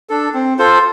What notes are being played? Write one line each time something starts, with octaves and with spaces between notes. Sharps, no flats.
D4 A4
C4
F4 A4 C5